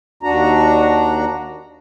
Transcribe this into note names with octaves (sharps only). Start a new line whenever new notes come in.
D#2 D4 F#4 A#5